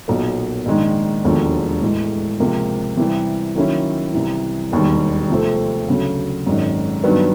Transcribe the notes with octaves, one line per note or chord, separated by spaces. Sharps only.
B1 A#2 F#3 A#3
A#1 G#2 D#3 G#3
E1 D#2 D3 F3
A2 E3 G#3
C#2 C3 F3 A#3
C3 E3 G3
D#3 F#3 A#3 C#4 E4
C2 C3 E3
E1 D#2 D#3 G3
C3 F3 A3 C4
D2 C#3 F#3
G#1 F#2 D#3 G#3
G2 D#3 F#3 B3